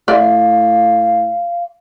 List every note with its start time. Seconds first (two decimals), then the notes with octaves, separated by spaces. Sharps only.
0.08 A2 D5 E5 F5